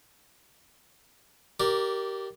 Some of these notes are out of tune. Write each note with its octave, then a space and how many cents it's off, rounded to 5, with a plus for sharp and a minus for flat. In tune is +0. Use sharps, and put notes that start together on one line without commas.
G4 -20 A#4 +0 D5 +0